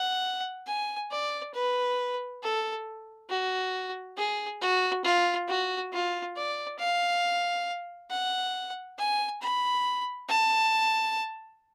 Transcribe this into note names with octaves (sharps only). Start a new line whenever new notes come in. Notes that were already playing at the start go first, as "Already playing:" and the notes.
Already playing: F#5
G#5
D5
B4
A4
F#4
G#4
F#4
F4
F#4
F4
D5
F5
F#5
G#5
B5
A5